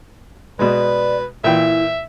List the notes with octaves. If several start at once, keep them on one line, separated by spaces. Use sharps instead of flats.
B2 G#3 B4 D5
A#2 E3 E4 E5 G5